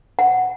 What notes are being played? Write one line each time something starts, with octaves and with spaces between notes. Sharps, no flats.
F#5